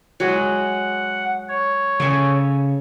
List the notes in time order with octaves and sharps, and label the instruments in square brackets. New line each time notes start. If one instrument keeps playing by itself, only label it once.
[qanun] F#3 G#3 [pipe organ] F#5
[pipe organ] C#5
[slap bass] C#3 [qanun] A4 G#5